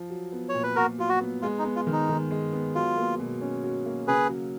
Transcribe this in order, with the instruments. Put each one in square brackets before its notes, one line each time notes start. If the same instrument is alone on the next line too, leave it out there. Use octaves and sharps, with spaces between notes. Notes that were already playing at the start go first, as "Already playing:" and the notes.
Already playing: [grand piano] F3
F#3
B3
[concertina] C#5
[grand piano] A#2
[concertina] B4
[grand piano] A#2 [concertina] F#4 A#4
[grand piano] F#3 [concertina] F4
[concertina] F#4
[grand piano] B3
[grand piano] G#3 [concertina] F4
[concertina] D#4
[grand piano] B3
[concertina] F4
[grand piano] D#3
[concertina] D#4
[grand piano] D#3
G#3
B3
[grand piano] F#3 [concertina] F4
[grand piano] A#3
B2
C#4
F#3
A#3
[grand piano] C#3 [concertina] G#4 B4
[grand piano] F#3